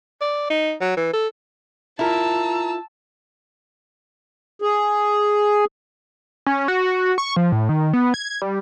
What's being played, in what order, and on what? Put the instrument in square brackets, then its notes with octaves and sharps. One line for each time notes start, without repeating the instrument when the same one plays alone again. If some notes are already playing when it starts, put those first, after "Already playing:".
[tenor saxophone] D5
D#4
F#3
E3
A4
[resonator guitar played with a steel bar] E4 A#4 [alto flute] F4 [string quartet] A5 E6 [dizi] A#5
[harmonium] G#4
[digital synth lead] C#4
F#4
C#6
F3
A2
D#3
B3
G#6
G3